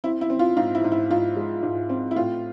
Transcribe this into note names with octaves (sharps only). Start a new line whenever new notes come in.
C4 E4
E4
C4
F4
G#2 F4
E4
G#2
E4
G#2 F4
G#3
G#2
C4
E4
A2 F4